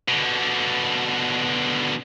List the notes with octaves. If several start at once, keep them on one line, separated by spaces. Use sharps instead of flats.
B2 D3